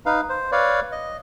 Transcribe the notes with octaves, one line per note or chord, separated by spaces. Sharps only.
D#4 B4 F5
C5
B4 C#5 D5 F5
D#5